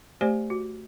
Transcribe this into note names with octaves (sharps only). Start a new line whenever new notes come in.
A3 G4 C5 D5 G#5
F#4